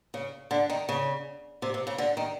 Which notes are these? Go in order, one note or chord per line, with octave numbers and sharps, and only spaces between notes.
C#3
D3
D#3
C#3
C3
C3
C#3
D3
D#3